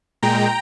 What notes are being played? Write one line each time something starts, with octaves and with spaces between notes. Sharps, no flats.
A#2 G#3 G5 A#5